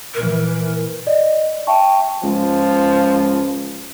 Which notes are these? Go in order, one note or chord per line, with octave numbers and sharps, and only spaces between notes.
A#2 E3 A#4
D5 D#5
E5 G5 A5 C#6
C#2 F3